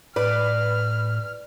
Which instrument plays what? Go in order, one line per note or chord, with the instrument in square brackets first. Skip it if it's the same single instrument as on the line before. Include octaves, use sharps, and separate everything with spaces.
[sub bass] A2 [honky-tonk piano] B4 [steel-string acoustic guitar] D5 [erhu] F6